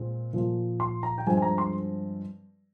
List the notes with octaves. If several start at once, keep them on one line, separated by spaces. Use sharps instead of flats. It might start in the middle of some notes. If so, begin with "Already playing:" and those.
Already playing: A#2 G#3 C4
A#2 F3 A#3 F4
C6
A#5
G5
G2 F3 G#3 C4 G#5
G#5
A#5
C6